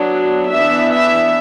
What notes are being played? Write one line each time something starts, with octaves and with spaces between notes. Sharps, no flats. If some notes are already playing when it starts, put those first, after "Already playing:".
Already playing: F#3 B3 D4
E3 B3 D4 E5
E5